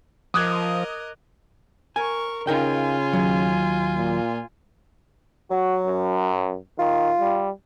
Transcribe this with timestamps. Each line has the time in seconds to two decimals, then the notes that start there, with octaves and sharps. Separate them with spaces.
0.34 F3 A#4 D#5 D6 D#6 F#6 G#6
1.96 A#4 G#5 C#6
2.47 C#3 D#4 F4 A#4 G5 G#5
3.13 D#2 F#3
3.96 A#2
5.51 F#3 F#4
5.87 F#2
6.79 D#3 F4
7.20 G3